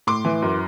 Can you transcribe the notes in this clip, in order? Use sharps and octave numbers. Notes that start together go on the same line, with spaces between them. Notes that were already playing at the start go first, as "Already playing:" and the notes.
A2 C6 D6
E3
F#2